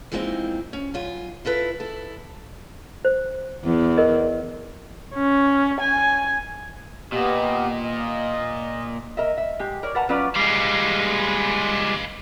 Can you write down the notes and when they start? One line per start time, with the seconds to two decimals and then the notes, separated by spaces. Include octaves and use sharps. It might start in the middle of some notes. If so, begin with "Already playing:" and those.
0.12 E3 F3 G#3 A#3 C4 D#4
0.73 C#4
0.94 F#2 F4 G#5
1.45 E4 F4 A4 B4
1.80 E4 A4
3.05 C5
3.64 E2
3.97 A#4 D#5
5.15 C#4
5.81 G#5
7.13 A#2 B3 G4 D#5
7.83 D#5
9.17 A#4 D#5 E5
9.37 E5
9.59 G#3 G4
9.83 A#4 C#5 D5
9.95 A#4 B4 F#5 A5 A#5
10.09 F#3 C#4 F4 B4 D5
10.36 G3 G#3 B4 F5